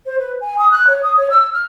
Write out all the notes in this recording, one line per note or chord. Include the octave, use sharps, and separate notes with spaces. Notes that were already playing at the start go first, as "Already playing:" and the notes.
C5
B4
G#5
D#6
F#6
C#5
D#6
C#5
E6
F6